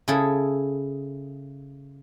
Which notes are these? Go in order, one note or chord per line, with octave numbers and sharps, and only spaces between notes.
C#3 E4 G#4 A4